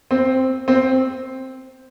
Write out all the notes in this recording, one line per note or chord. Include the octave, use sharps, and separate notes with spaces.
C4
C4